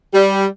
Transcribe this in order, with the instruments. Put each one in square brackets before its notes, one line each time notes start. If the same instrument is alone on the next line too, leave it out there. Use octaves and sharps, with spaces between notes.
[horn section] G3